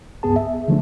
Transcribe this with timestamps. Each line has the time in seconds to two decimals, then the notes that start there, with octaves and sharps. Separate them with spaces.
0.23 C#2 G2 B3 G#4 A5
0.36 E5
0.68 D3 F3 A3 D4